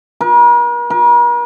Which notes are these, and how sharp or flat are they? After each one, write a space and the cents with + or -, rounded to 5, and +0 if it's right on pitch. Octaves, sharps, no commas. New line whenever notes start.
A#4 +45
A#4 +45